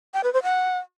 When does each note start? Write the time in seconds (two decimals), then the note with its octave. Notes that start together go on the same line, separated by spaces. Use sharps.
0.14 G5
0.24 B4
0.33 C5
0.43 F#5